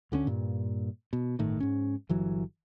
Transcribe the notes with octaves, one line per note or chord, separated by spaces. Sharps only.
D2 D3 E3 C#4
G2 A#2
B2
G1 A2 D#3
G#2 C#4
G1 E3 F#3